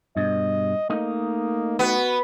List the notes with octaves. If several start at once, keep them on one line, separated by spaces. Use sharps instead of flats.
G2 B2 D#5
A3 A#3 D#4 D#5
B3 F#4